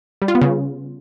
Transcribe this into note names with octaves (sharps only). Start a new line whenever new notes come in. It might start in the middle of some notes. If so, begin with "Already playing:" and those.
G3
F4
B3
C#3